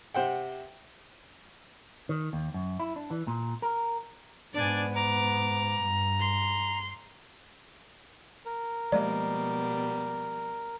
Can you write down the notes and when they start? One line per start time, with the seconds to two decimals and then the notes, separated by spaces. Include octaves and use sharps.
0.14 C3 C5 F#5 G5
2.09 D#3
2.33 D#2
2.54 F#2
2.80 E4
2.96 D4
3.11 E3
3.27 A#2
3.62 A#4
4.54 G#2 B3 D4 D5 G#5
4.95 A#5 D6
5.81 G2
6.20 C6
8.45 A#4
8.92 B2 F3 G3 G#3 A#3 D5